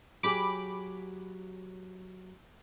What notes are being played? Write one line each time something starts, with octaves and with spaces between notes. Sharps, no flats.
F#3 G4 G#4 B5 D6